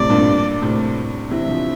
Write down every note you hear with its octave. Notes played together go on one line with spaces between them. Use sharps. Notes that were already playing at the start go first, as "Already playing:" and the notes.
Already playing: A2 C3 D5
G2 A#2
A2 C3
C3 E3 E5
D3 F3